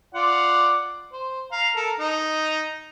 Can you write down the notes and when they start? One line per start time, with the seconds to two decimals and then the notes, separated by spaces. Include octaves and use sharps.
0.15 F4 D5 F#5
1.12 C5
1.52 F5 A#5
1.76 A4 A#4
1.99 D#4